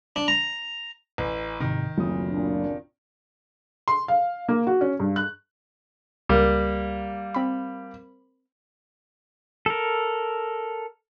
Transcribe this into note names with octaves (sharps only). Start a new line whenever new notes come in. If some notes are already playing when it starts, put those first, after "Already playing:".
D4
A#5
A1
G#2 C3 D#3
F#1 D2 C4 F4 D#6
A#2 D4
C6
F5
A#3
F#4
C#4
G2
F#6
C#2 G3 A#3
C4 B5
A4 A#4